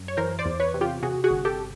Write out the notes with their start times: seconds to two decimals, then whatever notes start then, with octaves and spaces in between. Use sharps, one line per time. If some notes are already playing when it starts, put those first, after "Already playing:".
Already playing: F#2
0.08 C#5
0.17 E3 A#4 C5
0.39 C5 D5
0.46 E2
0.60 B4 C#5
0.74 C3
0.81 F4 G4
1.03 C3 F#4 G#4
1.24 F#4 G#4
1.31 G1
1.45 G4 A4